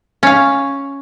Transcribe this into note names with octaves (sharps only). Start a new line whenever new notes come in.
C#4 F5